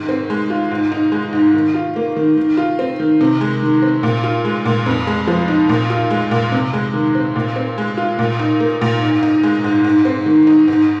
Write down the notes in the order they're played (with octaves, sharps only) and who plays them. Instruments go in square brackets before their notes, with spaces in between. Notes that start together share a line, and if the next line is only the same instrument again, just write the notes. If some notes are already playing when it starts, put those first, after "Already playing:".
Already playing: [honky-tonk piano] G#2 D#3
C4
G#3
F4
G#2
D#4
G#3
G#2
D#3
F4
A#3
D#3
D#3
F4
C4
D#3
C3
G#3
D#3
C4
A#2
F4
G#3
A#2
F2
G#3
F3
D#4
A#2
F4
G#3
A#2
C3
G#3
D#3
C4
A#2
C4
G#3
F4
A#2
D#4
A#3
A#2
G#2
D#4
G#3
G#2
G#2
C4
D#3
D#4
G#2